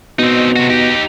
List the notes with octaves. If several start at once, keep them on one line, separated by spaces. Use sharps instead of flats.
B2 C4 D#4
C3 F#4
D#4 G4